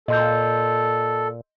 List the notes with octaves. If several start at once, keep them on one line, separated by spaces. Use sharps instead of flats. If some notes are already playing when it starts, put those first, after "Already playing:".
A#2 A4 D#5 C6 G6